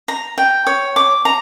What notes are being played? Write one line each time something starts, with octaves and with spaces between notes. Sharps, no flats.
A#5
G5
C#5
D6
A#5